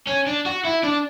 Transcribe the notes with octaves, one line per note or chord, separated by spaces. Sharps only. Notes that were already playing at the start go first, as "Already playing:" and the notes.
C#4
D4
F#4
E4
D4